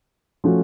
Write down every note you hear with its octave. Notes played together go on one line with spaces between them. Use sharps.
F3 A3 C#4 F#4